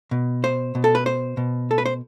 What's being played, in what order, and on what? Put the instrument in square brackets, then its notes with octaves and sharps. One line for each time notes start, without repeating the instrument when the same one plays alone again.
[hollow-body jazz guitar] B2
C5
B2
A4
B4
C5
B2
A4
B4
C5